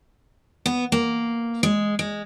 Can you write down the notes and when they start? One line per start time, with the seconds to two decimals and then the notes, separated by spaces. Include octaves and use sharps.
0.66 B3
0.92 A#3
1.63 G#3
1.99 G#3